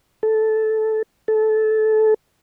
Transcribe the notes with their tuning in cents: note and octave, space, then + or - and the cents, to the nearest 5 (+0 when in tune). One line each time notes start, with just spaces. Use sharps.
A4 -10
A4 -20